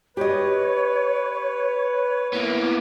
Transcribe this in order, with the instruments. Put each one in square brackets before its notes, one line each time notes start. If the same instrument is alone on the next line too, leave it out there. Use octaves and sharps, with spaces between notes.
[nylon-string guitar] G4 D#5 [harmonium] B4 [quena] C#5
[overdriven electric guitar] A#3 B3 [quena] E4